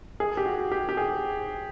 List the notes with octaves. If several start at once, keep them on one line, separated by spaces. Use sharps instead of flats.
G#4
G4
F#4
G4
G4
G#4